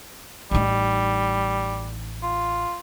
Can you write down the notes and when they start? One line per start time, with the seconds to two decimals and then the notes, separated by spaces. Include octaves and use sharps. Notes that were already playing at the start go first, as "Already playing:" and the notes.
0.51 A1 G3 D#4
2.23 F4